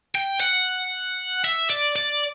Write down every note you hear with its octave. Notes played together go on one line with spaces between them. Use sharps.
G5
F#5
E5
D5
D5